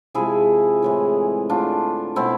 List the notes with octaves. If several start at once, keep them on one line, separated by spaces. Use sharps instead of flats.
C3 F3 G#3 E4 G#4
A2 E3 G#3
D3 A3 D4 F4
B2 A3 C4 E4